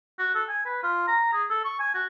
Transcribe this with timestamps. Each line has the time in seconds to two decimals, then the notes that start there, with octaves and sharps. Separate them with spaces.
0.19 F#4
0.35 A4
0.49 G#5
0.65 B4
0.83 F4
1.08 A#5
1.33 G#4
1.50 A4
1.64 C#6
1.80 G#5
1.95 F#4